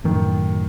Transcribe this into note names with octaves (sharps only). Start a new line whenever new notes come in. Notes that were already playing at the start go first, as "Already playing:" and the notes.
F#2 A2 D#3